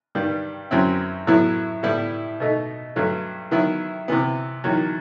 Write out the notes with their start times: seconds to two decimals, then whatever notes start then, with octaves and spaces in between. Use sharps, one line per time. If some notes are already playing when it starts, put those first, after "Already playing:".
0.15 G2 D#3 G3
0.71 F#2 F#3 C4 E4
1.27 A2 F#3 B3 E4
1.83 A2 G3 B3 E4
2.40 B2 A3 D#4
2.96 G2 F#3 A3
3.51 D#3 F#3 B3 E4
4.08 C3 E3 B3
4.64 E2 D#3 F#3